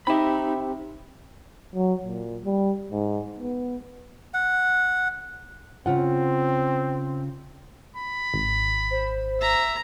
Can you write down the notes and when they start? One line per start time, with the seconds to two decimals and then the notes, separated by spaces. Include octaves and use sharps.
0.07 C4 D#4 G4 E5 B5
1.75 F#3
2.05 A#2
2.45 G3
2.92 G#2
3.39 B3
4.34 F#5
5.86 C#3 C4 F4 F#5
7.96 B5
8.34 G#1
8.91 C5
9.41 E5 A#5